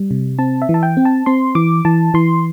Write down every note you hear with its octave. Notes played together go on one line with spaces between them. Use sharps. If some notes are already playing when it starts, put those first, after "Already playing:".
Already playing: G3
C3
C4 A5
E5
E3
A5
G5
C4
A5
C4 C6
E3 D6
E3 A5
E3 C6